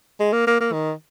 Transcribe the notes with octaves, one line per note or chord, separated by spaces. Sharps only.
G#3
A#3
A#3
A#3
D#3